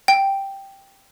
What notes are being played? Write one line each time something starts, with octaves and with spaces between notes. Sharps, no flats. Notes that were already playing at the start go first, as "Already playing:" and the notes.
G5